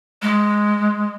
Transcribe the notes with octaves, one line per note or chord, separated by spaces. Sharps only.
G#3